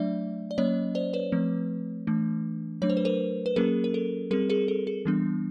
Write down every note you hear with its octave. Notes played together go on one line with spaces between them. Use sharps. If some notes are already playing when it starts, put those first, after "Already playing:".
Already playing: F#3 A3 D4 D5 E5
D5
F#3 A#3 C#4 C#5 D#5
C5 D5
B4 C#5
F3 A3 C4
E3 A3 D4
F#3 A3 D4 C#5
C5
B4
A#4 C5
B4
F#3 A#3 C#4 G#4 A#4
A#4
A4
G3 C4 G#4 A#4
G#4 A#4
A4
G#4
E3 G3 B3 D4